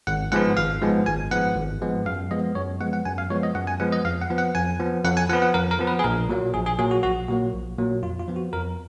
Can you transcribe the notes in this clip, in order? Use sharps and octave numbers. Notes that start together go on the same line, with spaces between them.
G#1 F#5
G#2 F3 G#3 B3 F#5
G#1 F5
G#2 F3 G#3 B3
G#1 G#5
G#2 F3 G#3 B3 F#5
G#1
G#2 F3 G#3 B3
F#2 F5
F3 G#3 B3 D#5
F#2 C#5
F3 G#3 B3 F#5
F#5
F#2 G#5
F5
F3 G#3 B3 C#5
D#5
F#2 F#5
G#5
F3 G#3 B3 F#5
D#5
F2 F5
F#5
F3 B3
F#5
F2 G#5
F3 B3
F2 F#5
G#5
F3 B3 F#5
F#5
F2 A#4
A#4
F3 B3
B4
G#4
A#1 A#4
A#2 F#3 A#3
A#1 G#4
G#4
A#2 F#3 A#3 G#4
F#4
A#1 F#4
A#2 F#3 A#3 F#4
A#1
A#2 F#3 A#3
F2 F4
F4
F3 B3
F#4
F2 A#4